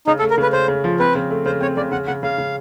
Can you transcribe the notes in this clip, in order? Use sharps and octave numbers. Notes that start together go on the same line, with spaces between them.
C#3 D#4
A4
A3
A#4
C#3 B4
C#3 C5
C#3
F3
C4 B4
C#3
A3
C#3 C5
C4 C#5
C#3 D5
C#3 F#5
C#3 F#5
C#3 F5
C#3